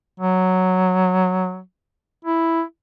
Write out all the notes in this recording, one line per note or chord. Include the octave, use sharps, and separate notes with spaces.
F#3
E4